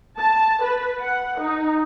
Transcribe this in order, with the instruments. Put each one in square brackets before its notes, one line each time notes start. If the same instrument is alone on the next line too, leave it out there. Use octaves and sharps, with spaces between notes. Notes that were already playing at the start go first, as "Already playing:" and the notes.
[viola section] A5
B4
F#5
D#4